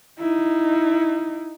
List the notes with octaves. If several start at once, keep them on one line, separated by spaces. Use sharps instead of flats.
D#4 E4